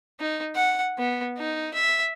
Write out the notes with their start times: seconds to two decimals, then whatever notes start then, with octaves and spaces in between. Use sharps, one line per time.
0.20 D#4
0.55 F#5
0.98 B3
1.38 D#4
1.74 E5